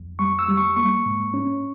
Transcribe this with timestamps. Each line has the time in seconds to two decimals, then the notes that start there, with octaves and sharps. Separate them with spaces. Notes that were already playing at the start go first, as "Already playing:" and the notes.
Already playing: F2
0.19 G3 C#6
0.39 E6
0.48 G3
0.57 C#6
0.76 A#3 C#6
1.06 G#2
1.34 C#4